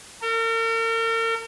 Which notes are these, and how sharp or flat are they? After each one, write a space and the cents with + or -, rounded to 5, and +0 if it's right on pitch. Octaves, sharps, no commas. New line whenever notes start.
A#4 -40